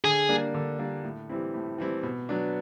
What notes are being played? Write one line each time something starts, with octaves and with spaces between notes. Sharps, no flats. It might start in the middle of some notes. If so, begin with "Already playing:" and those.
D3 G#4
G3 A#3 D4
D3
G3 A#3 D4
A2
E3 G3 C4 E4
A2
E3 G3 C4 E4
B2
F#3 B3 D4